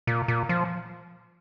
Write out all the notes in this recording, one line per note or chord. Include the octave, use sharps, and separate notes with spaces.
A#2
A#2
F3